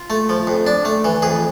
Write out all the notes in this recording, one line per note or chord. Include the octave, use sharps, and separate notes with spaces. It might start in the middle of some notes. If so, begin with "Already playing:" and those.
Already playing: F4
A3
F3
F2
D4
A3
E3
F2 G#4